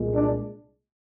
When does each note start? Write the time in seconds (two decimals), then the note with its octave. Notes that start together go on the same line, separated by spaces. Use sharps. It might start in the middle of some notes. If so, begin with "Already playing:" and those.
Already playing: C2 A#2 G#3
0.14 D4